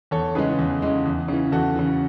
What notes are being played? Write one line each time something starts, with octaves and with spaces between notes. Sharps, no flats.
E2 A4 C#5
C#3 E3 G#3 G#4 B4
E2
C#3 E3 G#3
E2
C#3 E3
E2 F#4 A4
C#3 E3